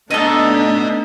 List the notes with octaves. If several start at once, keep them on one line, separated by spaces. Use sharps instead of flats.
A3 B3 D4 D#4 A4 B4 D#5